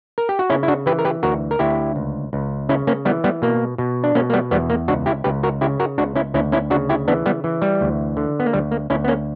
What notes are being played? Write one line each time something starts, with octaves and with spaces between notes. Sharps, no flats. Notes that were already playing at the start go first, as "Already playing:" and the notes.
A#4
G4
F#4
C#3 C#4 E4
E4
D4 F#4
E3 G4 B4
A#4
G4 B4
D2 F#4 A#4
A#4
D2 E4 G4
C#2
C#2
C#3 C#4 E4
A#3 C#4
E3 G3 B3
G3 B3
B2 A#3
B2
D4
B2 A#3 C#4
A#3
G3 B3
E2 G3 B3
A#3
C#2 D4 F#4
E4 G4
C#2 G4 B4
F#4 A#4
C#3 E4 G4
F#4 A#4
C#2 D4 F#4
C#4 E4
D2 C#4 E4
C#4 E4
C#3 D4 F#4
E4 G4
E3 B3 D4
G3 B3
E3
G3
D2
D3
B3
A#3
D2 G3
A#3
D2 C#4 E4
B3
A#3 C#4